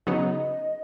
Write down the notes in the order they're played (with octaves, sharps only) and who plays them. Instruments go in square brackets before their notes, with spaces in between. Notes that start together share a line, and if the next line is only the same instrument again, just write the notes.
[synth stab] C#3 F#3 B3 D#4 [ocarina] D#5